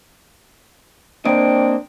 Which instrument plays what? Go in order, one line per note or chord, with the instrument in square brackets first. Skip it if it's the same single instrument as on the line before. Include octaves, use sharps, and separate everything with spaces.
[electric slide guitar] A#3 C4 D#5 [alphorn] D4 [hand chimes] C5 G5 D7